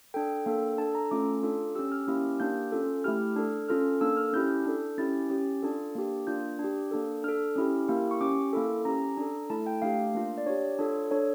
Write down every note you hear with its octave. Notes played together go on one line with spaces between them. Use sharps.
D4 A4 G5
A#3 D4 A4
D4 A4 A5
A#5
A3 C#4 F4 A4 D6
D4 F4 A4
C#4 G4 E6
F6
A#3 C#4 E4 G4
A#3 D4 G4 G6
C#4 F4 A4
A3 E4 G4 F6
D4 A4
C#4 F4 A4 F6
A#3 D4 A4 E6
F6
C#4 E4 G4 G6
D4 A4
C#4 E4 G4 A6
C#4 G4
D4 F4 A4
A#3 D4 G4
A#3 D4 F4 G6
D4 G4
A#3 D4 A4
D4 A4 F6
C#4 E4 G4
A#3 E4 G4
C#6
C#4 G4 D6
A#3 E4 A4
C#4 G4 A#5
D4 A4
A3 E4 A4 A5
G5
A3 D4 G4 F5
A#3 D4 F4
D5
D4 G4 C#5
D4 F4 A4
D4 A4 C#5